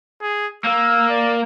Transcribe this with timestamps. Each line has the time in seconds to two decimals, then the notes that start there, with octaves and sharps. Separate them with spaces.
0.22 G#4
0.64 A#3 E6
1.09 D5